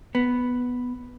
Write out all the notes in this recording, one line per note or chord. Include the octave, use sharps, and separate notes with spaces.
B3